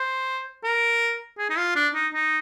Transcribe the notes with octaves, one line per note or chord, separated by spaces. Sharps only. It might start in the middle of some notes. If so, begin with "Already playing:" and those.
Already playing: C5
A#4
G#4
D#4
F4
D4
D#4
D#4